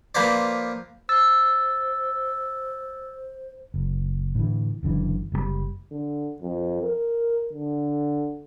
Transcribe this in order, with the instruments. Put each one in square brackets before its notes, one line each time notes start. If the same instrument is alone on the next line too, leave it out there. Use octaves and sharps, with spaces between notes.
[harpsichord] F3 A#3 B4 C5 D5
[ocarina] C5 [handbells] E6 A6
[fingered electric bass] F#1
A2 D3 E3
F#1 F#2 D3 E3
F#1 A#2 G3
[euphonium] D3
F2
A#4
D3